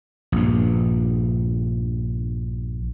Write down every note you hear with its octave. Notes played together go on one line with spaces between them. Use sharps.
A#1 G2